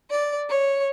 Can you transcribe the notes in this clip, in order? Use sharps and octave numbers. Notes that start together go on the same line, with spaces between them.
D5
C#5